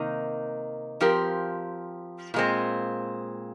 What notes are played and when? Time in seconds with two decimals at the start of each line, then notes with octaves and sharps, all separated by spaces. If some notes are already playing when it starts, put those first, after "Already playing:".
Already playing: C3 D#3 A#3 D#4
1.01 F3 C4 G4 A#4
2.34 A#2 G#3 C4